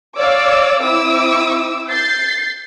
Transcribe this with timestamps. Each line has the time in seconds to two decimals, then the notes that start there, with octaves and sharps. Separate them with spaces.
0.18 C#5 D5 F5 D6 E6
0.82 C4 E4 D6 E6
1.89 G6 A6 C7